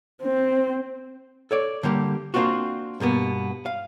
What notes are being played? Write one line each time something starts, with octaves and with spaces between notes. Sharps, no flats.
C4
A4 C#5 D5
D3 G3 A#3 G4
A#3 C4 D4 F4 F#4
G2 B2 A#3 B3
F5